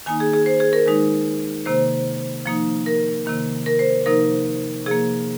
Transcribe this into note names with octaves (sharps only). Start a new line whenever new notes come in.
D#3 A#3 D#4 G#5
G#4
G#4
C5
G#4
A#4
D#3 G#3 D#4
C3 D#3 A#3 C5
F3 A#3 D#4
A#4
C3 D#3 A#3
A#4
C5
C3 F3 A#3 D#4 A#4
C3 F3 A#3 G#4